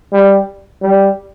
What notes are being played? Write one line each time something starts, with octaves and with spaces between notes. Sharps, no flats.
G3
G3